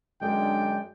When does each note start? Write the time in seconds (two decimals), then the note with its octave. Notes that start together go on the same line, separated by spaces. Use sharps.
0.22 F#2 D3 G#3 D4 G5